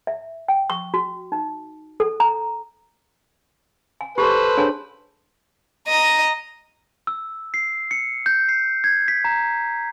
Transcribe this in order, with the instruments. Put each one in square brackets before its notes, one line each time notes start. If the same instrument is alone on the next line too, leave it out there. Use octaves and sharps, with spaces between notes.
[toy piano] E5
G5
C#6
F#4
D#4
A4
A#5
G#5
[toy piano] G4 [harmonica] A4 B4 C5
[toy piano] D4 G#4 C#5
[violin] D#5 [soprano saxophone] A#5
[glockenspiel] E6
C7
C#7
G6
C7
G#6
B6
A#5